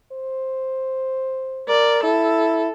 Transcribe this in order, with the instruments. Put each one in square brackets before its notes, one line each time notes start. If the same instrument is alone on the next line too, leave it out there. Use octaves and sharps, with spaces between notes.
[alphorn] C5
[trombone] A#4 [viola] D5
[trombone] E4 [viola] A4